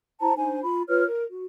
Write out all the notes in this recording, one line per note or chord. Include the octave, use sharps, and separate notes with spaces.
E4 C5 A5 A#5
D4 D#4 C5 G#5
F4 B5
F4 B4 C#5 F6
A#4
F#4